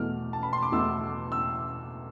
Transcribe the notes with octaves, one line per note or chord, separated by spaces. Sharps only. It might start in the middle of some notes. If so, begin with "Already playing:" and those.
Already playing: E2 B2 A3 E4 F6
A5
B5
C6
D6
E2 B2 A3 E4 E6
E6